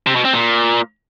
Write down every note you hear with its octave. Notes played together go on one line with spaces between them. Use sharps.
C3
B2
C4
A#2